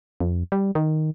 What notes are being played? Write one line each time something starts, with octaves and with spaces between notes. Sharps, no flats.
F2
G3
D#3